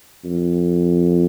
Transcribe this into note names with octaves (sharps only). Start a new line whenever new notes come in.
F2